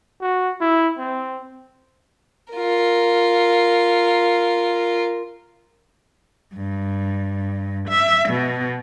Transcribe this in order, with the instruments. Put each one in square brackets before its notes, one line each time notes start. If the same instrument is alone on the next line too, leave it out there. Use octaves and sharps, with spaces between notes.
[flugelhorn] F#4
E4
C4
[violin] F4 A#4
[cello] G2
E5
B2